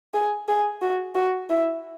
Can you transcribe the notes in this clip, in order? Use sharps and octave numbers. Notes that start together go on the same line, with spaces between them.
G#4
G#4
F#4
F#4
E4